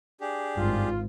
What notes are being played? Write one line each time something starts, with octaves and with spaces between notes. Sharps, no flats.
D4 G4 G#4
G#1 G2 F4